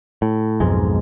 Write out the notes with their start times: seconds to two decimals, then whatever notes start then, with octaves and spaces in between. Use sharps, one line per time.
0.22 A2
0.60 B1 F2 G#2 G#3